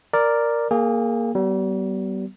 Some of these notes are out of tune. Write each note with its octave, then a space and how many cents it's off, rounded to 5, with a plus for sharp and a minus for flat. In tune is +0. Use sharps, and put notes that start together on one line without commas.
A#4 +0 D5 +0
A#3 +0 G#4 +10 G#5 -45
G3 -40 B3 +0